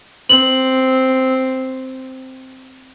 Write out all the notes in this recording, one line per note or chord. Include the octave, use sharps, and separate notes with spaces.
C4 F#7